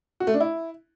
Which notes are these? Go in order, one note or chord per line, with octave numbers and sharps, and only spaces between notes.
F#4
A3
D4
E4